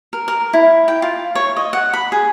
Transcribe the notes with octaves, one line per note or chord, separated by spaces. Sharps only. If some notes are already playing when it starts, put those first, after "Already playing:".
A#4
A#4
E4
G5
F4
C#5
D#5
F#5
B5
G#4